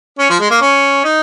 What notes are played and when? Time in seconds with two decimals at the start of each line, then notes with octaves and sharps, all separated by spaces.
0.19 C#4
0.30 F3
0.40 G#3
0.50 A#3
0.62 C#4
1.04 D#4